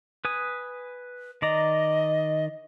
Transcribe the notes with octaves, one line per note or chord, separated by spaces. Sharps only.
B4 G#5 D#6
D#3 D5 D#5 A#5